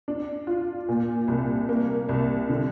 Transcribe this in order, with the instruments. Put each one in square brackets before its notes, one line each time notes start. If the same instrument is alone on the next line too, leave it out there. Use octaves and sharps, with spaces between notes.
[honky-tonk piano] D4
F4
A#2
C2
A#3
C2
D3